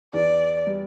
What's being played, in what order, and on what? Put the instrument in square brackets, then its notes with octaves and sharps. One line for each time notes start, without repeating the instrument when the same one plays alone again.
[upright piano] E2 E3 [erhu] D5
[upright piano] G3